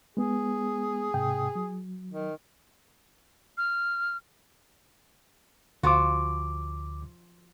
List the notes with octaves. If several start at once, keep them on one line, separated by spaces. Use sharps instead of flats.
G#3 B3 G#4
G#2 C3 G5
F#3
D#3
F6
D2 F3 F4 F#4 D6